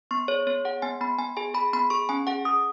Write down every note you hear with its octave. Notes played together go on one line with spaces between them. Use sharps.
B3 C#6
G#4 C#5
B3 C#5
G#4 F#5
B3 G#5
B3 B5
B3 G#5
G#4 G#5
G#4 B5
B3 B5
G#4 C#6
C#4 G#5
G#4 F#5
G#4 D#6